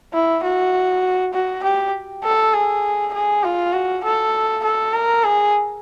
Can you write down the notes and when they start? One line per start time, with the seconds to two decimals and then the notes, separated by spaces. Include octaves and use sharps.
0.14 E4
0.44 F#4
1.34 F#4
1.63 G4
2.24 A4
2.54 G#4
3.13 G#4
3.44 F4
3.73 F#4
4.04 A4
4.64 A4
4.94 A#4
5.24 G#4